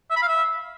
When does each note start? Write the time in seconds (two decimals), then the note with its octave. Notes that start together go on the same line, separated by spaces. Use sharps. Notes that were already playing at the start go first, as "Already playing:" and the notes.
0.10 E5
0.16 B5
0.22 F5
0.28 E5